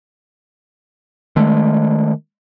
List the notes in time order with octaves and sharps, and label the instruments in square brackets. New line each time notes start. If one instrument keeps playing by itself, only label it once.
[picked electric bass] D#3 G#3 A3